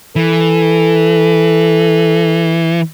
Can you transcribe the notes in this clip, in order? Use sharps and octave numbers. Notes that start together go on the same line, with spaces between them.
E3 A4